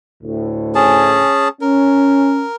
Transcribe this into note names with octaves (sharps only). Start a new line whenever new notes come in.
D2 A2
C#4 G#4 A5
C#4 A#4